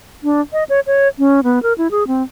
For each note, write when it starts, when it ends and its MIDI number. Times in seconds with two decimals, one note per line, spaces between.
0.23 0.41 62
0.53 0.64 75
0.69 0.80 73
0.87 1.08 73
1.19 1.40 61
1.44 1.62 59
1.63 1.73 70
1.78 1.88 64
1.91 2.06 68
2.07 2.23 60